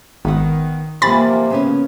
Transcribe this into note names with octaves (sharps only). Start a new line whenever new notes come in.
G#1 D#3 B3 F#5
C3 E3 F3 A#3 G#5 B5 A6
C#3 B3 C#4